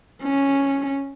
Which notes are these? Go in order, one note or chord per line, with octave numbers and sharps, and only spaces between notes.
C#4